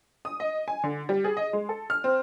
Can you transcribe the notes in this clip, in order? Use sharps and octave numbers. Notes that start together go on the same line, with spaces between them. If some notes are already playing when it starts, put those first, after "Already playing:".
D#6
D#5
G#5
D3
G3
G#4
D#5
G#3
A4
F6
C4